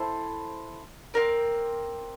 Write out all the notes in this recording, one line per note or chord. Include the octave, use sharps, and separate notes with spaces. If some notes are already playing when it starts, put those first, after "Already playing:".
Already playing: E4 A4 C5
C4 E4 A#4 D5